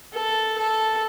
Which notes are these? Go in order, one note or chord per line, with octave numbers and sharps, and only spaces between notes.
A4
A4